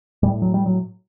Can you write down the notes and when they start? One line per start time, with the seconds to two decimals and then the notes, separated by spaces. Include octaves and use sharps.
0.23 A2 G3
0.42 F#3
0.54 G3
0.66 F#3